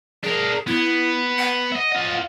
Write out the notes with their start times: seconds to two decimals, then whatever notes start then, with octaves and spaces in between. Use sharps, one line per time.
0.23 D4 G#4 A#4
0.67 B3 E4
1.38 F#5
1.72 D#5 E5
1.92 F4 D#5